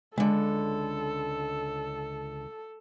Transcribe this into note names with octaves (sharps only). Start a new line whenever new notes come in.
C#2 D3 G#3 A4